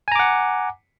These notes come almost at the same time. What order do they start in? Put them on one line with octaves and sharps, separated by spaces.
G#5 A#5 D6 F#5